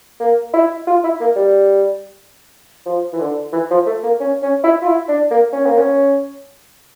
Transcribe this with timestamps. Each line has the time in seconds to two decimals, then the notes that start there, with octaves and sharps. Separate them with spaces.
0.20 A#3
0.53 E4
0.87 F4
1.04 E4
1.20 A#3
1.36 G3
2.86 F3
3.13 E3
3.20 D3
3.53 E3
3.70 F3
3.86 A3
4.03 A#3
4.20 C#4
4.42 C#4
4.64 E4
4.82 F4
4.87 E4
5.08 D4
5.31 A#3
5.53 C#4
5.66 A#3
5.78 C#4